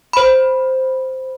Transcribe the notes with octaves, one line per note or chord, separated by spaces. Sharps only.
C5 B5